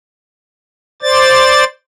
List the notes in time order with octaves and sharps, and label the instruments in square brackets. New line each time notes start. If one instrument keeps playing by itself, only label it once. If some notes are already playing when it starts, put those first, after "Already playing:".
[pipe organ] C5 D5 A6